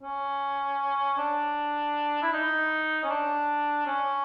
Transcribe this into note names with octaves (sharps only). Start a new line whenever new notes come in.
C#4
D4
E4
D#4
C#4
D4
C#4